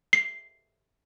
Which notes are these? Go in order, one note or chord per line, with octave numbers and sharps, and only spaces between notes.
C7